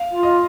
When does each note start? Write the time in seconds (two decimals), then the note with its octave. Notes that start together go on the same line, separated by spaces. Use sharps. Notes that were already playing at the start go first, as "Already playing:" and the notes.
Already playing: F5
0.12 F4
0.23 D#5